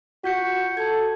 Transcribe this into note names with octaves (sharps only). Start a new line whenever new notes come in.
F4 F#4 G6 C#7
A4 A5 G#6